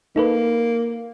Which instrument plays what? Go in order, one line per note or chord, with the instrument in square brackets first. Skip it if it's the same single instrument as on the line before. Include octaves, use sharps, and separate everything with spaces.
[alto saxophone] A#3 [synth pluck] D#4 A4 B4